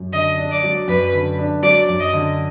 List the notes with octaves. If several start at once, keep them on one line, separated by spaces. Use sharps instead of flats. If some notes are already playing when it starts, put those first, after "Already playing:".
Already playing: F#2
D3 D#5
D4
D5
F#3
F#2 B4
D3
D4
F#3 D5
F#2
D#5
D3